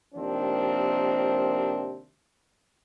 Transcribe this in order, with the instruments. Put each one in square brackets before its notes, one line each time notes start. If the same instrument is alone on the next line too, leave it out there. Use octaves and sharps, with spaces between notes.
[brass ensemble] D#2 C3 D#3 F3 C4 D4